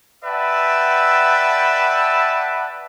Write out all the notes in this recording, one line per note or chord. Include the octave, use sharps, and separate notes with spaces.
B4 D5 E5 F#5 G5 A5